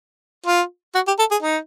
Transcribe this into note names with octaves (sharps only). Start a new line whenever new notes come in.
F4
F#4
G4
A4
G#4
D#4